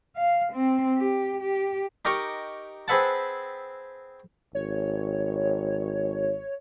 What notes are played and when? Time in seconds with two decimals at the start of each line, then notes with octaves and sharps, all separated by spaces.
0.17 F5
0.54 C4
0.97 G4
1.41 G4
2.05 D#4 G4 A#4 D#5 A#5 C#6
2.88 C4 G#4 B4 E5 F#5 A5
4.55 G#1 C#5